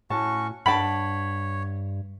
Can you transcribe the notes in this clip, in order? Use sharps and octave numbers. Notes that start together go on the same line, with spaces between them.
A2 C#4 F#4 A5 C#6
G2 C#5 F#5 G5 A5 B5